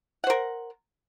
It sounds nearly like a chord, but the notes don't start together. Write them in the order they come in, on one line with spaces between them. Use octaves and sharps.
F#5 C5 A#4